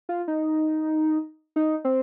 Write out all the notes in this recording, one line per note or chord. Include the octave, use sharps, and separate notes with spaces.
F4
D#4
D#4
C4